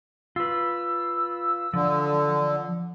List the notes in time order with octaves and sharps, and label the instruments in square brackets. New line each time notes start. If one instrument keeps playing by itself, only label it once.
[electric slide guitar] F4 B4 [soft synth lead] E6
[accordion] D3 [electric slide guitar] F3